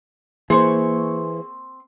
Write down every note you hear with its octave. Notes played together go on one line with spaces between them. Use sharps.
E3 A#3 C4 G#4 C5 C#6